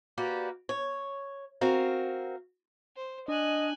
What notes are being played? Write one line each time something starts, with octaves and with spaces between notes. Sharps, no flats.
A#3 F#4 G4 B4 D5
C#5
C4 F#4 A#4 F5
C5
D4 D#5 G#5 F#6